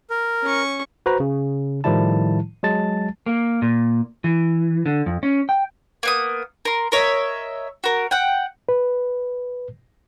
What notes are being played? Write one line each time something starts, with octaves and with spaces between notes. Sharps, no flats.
A#4
C#4 C#6
F#4 B4 C5 A#5
C#3
A2 D#3 F3 G3 E4 A5
F#3 G#3 A5 A6
A#3
A#2
E3
D3
F2
C#4
G5
A#3 B3 D#6
A#4 C6
A#4 C#5 D#5 E5
F#4 A#4
F#5 G5
B4